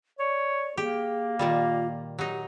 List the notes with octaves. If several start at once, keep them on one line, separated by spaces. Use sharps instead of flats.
C#5 D5
A#3 G4 G#4
A#2 D#3 G3 F4
F#3 D#4 G4